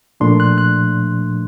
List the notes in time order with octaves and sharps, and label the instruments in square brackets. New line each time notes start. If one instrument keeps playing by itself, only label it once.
[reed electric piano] A#2 F3 A3 D4 C6
F#6
F#6